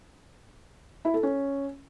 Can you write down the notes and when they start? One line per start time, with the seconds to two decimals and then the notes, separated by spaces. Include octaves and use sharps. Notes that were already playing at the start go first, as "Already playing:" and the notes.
1.05 E4
1.14 A4
1.23 C#4